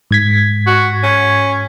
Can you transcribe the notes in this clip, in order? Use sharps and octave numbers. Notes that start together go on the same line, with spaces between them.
G#2 G#6 B6
F#4
C#4